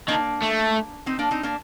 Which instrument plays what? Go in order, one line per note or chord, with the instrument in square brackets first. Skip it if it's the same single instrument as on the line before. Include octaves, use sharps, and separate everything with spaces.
[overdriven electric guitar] D#3 [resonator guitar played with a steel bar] A#3 D4
[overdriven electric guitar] A3
[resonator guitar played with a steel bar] C4 D#4
A#3 D4
C4 D#4
A#3 D4